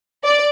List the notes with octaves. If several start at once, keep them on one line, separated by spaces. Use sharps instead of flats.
D5